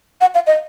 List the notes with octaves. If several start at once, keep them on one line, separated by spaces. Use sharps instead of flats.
F#5
F5
D#5